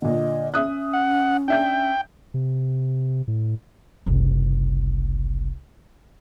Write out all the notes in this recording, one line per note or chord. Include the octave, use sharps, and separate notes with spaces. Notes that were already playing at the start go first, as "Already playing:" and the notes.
A#2 D3 D#5
C#4 E5 D#6 F#6
F#5
D4 E5 G5 G6
C3
A2
F#1 C2